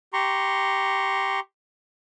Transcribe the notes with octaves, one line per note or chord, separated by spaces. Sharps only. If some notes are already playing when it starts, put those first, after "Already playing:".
G4 A#5 C6 C#6